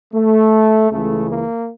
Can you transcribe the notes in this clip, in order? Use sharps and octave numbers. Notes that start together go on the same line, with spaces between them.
A3
C#2 C#3 E3 A3
A#3